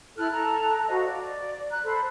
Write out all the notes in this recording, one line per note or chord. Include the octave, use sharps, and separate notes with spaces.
E4 A4 F6 F#6
A4 A5 A#5 F#6
F#4 C5 D#5 F5
D5
A#5 F#6
A4 C5 B5